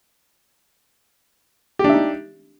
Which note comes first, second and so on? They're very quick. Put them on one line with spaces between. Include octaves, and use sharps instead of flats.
G4 D4 E5 D#4